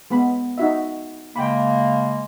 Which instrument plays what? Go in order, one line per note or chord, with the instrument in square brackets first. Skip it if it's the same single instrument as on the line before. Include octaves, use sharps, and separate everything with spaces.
[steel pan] G#3 B3 B5
D#4 F#4 E5
[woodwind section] C#3 G#3 A#3 [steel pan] G5 B5